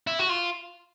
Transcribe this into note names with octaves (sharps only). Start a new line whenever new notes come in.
E4
F#4
F4